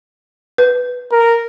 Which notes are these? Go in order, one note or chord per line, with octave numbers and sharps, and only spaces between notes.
B4
A#4